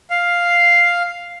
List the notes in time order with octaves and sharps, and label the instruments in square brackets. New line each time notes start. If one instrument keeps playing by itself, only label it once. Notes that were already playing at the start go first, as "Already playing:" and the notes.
[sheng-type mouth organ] F5